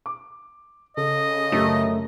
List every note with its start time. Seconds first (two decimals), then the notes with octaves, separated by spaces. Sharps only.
0.06 D6
0.97 C#3 A4 D#5
1.52 F#2 A3 C#4 G4